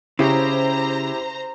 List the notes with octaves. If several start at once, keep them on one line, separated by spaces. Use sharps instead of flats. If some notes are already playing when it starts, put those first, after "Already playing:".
C#3 E4 G4 C5 A#5